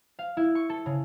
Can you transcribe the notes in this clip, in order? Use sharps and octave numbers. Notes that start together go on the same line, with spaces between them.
F5
E4
C#6
A4
C#3